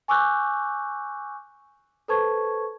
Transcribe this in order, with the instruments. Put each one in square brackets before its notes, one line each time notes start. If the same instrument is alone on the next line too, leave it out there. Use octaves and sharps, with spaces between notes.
[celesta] G#5 C#6 D6 E6 F#6 G6
A4 B4 C5 A5 C#6 G#6